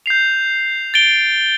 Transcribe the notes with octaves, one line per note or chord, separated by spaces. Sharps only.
G6 C7 F7
A6 D7 G7